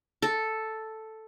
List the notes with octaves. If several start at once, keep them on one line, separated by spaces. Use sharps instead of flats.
A4